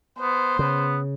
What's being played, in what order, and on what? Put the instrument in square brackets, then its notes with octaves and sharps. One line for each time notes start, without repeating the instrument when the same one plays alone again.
[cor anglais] B3 [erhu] C5
[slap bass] C#3 [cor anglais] B3